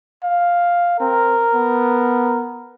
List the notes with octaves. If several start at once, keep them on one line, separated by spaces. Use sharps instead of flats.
F5
C4 A#4
B3